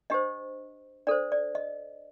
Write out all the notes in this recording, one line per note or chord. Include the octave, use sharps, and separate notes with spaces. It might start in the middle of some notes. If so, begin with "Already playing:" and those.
D4 G4 C5 D#5
D4 A4 C5 D5
D5
D#5